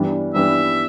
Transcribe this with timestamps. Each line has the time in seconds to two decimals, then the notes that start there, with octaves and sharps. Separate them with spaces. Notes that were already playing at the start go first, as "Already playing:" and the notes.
Already playing: G2 E3 G3 B3 D4
0.34 G2 E3 G3 B3 D4 E5